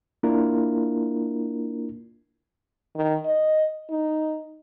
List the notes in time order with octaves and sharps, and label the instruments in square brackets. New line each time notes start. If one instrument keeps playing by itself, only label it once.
[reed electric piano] A#3 D4 E4 F4 A#4
[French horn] D#3
D#5
D#4